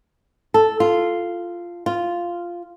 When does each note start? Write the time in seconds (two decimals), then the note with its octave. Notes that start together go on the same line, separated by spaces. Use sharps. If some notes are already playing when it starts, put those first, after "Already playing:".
0.54 A4
0.80 F4
1.86 F4